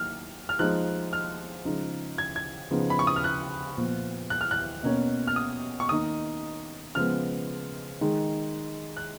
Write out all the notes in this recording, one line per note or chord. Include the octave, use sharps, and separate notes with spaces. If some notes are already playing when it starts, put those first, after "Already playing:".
Already playing: D#3 F#3 A#3 F6
F6
F3 G#3 D#4 F#6
F6
C#3 F3 G#3 D#4
G#6
G#6
C#3 F3 B3 D#4
B5
C#6
D#6
F6
F#6
A#2 F3 B3
F#6
F6
F#6
B2 A#3 C#4
F6
D#6
C#6
D#3 A#3 D#4 D#6
C#3 F3 G#3 B3 F6
D#3 G#3 D#4
F#6